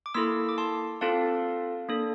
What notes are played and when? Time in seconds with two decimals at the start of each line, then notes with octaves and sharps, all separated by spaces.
0.06 D6
0.14 A#3 E4 A4 C6 E6
0.49 D6
0.58 A5 C6
1.01 C4 F4 A4 F5 A5
1.89 A#3 D4 A4